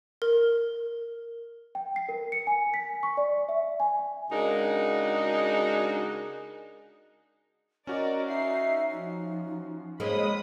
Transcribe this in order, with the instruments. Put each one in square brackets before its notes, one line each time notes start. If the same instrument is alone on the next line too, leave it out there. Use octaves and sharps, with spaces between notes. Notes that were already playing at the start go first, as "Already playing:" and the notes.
[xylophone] A#4
[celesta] G5
C7
A#4
C#7
G#5
B6
C#6
D5
E5
G#5
[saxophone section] C#3 G#3 D4 D#4 F#4 A#4
[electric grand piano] C#4 F#4 [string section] A#4 D5 [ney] D#5
[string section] D#4 C7 [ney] E5
[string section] F3 [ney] D#4
[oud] G#3 A#3 C4 [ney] C#5 [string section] B5 D#6